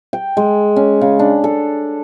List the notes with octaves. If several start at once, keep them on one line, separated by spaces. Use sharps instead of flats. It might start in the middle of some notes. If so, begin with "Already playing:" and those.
G5
G#3
C#4
C#3
D4
A4